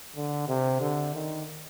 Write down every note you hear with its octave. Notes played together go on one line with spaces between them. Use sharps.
D3
C3
D3
D#3